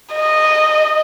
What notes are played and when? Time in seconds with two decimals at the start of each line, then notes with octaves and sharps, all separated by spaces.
0.15 D#5